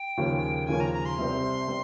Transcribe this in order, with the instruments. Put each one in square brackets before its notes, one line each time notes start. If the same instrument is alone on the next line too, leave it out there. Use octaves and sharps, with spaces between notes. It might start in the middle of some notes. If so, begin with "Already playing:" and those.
Already playing: [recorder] G5
[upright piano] D#2 C#3 F3 A#3 C#4
[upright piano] D#2 C#3 F3 A#3 C#4 [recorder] G#5
[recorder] A#5
A#5
C6
[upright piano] C2 C3 G3 C4
C3 G3 C4